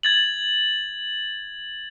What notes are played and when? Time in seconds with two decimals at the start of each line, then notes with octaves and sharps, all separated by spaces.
0.03 G#6 A6 F#7